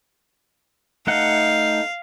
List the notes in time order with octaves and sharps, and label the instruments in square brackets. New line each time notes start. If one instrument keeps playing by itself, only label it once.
[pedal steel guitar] A3 D#4 F#5 [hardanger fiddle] F5